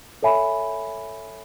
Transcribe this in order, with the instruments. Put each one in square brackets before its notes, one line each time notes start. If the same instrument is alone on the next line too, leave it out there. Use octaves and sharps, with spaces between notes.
[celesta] A4 C#5 E5 G#5 B5